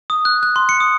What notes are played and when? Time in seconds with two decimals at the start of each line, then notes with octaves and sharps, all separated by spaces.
0.10 D#6
0.25 F#6
0.43 F#6
0.56 C6
0.69 C#7
0.80 D#6